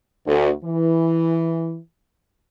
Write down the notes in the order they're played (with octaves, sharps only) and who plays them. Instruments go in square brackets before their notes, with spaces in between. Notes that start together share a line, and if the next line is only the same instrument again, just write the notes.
[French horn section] D2
E3